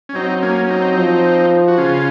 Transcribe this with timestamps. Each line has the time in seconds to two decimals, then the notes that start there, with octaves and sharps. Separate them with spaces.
0.09 C#4
0.15 F#3 C4 D#4
0.42 A#3 C#4
0.64 C#4
0.70 C4 D#4
0.97 F3
1.68 F#4
1.78 C#3 C#4 F4